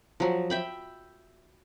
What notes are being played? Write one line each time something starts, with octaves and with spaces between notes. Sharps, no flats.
F3 F#3
E5 G5 B5